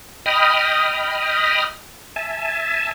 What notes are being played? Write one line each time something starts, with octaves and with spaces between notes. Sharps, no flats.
D#5 G5 B5 D#6 F6
E5 G#5 A5